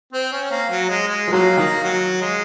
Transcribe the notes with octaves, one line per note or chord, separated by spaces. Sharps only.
C4
C#4
A#3
F#3
G#3
G#3
F3
F#3 A#3
D#3 A#3
F#3
G#3